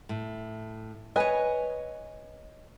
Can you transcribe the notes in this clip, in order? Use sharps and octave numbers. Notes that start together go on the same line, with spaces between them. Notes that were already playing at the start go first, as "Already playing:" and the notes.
A2
B4 C#5 D#5 G#5